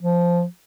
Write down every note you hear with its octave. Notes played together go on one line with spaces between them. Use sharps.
F3